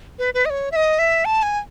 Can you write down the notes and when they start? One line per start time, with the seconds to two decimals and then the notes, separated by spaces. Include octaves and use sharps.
0.19 B4
0.34 B4
0.45 D#5
0.50 C#5
0.72 E5
0.76 D#5
0.99 E5
1.25 A5
1.43 G#5